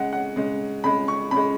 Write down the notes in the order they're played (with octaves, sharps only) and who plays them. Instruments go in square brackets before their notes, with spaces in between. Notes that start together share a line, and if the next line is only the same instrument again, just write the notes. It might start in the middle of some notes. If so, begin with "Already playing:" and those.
Already playing: [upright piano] C#3 G#3 F#5
F#5
C#3 G#3
C#3 G#3 B5
C#6
C#3 B5
G#3